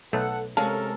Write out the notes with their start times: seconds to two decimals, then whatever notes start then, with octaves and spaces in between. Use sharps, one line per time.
0.13 B1 A3 A4 F#5
0.57 C3 G#3 C#4 A4 A#4 F5 A5